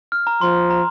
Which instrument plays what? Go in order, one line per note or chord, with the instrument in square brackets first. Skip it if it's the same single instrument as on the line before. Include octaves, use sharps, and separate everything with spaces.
[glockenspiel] F6
A#5
[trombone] F3 [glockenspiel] C6
[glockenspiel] A#5